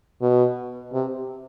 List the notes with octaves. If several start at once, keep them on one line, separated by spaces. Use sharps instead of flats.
B2
C3